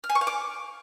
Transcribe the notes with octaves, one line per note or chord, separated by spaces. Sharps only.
F6
G#5
C#6
F5
D6